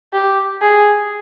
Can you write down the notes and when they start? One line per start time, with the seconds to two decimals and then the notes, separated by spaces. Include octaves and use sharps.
0.13 G4
0.62 G#4